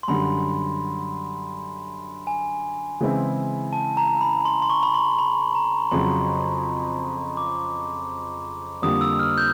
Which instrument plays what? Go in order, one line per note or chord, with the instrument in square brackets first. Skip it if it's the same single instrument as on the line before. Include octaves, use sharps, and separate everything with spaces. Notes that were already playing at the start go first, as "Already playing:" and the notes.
[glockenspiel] C6
[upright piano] F#2 D3 G3 [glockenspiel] B5
[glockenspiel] G#5
[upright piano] C#3 E3 G#3 C4 E4
[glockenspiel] A5
A#5
B5
C6
C6
C#6
B5
C6
B5
A#5
[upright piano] F2 C#3 F#3 [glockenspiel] C6
[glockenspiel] D6
[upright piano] F2 D3 G3 A#3 [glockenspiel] D#6
[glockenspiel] E6
F6
G6